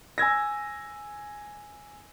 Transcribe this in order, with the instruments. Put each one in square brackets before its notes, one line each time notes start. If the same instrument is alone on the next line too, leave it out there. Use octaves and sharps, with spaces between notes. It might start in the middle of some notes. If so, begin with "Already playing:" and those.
[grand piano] G#5 E6 G#6 A#6